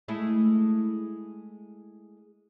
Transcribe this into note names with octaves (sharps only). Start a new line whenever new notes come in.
G#3 A3 E4